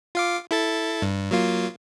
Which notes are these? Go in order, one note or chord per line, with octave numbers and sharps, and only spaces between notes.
F4 F5 D6
E4 A4 A6
G2
F#3 A#3 F4